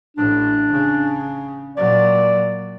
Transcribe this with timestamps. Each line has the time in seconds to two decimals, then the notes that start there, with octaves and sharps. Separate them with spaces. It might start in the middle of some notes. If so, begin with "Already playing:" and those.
0.17 A1 A2 D4
0.72 C#3
1.77 A#2 F#3 D5